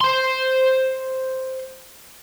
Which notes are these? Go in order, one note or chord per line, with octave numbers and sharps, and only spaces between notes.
C5 C6